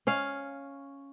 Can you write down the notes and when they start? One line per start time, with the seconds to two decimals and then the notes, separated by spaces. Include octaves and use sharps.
0.07 C#4 C#5 F5